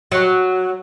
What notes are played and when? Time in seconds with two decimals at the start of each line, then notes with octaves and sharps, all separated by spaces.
0.12 F#3